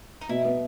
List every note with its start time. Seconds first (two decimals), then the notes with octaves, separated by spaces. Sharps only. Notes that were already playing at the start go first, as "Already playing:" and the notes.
0.21 D#4
0.29 B2 E4
0.45 B3